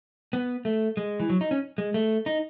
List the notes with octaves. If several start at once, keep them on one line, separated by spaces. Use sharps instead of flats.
B3
A3
G#3
E3
F#3
D#4
C#4
G#3
A3
D#4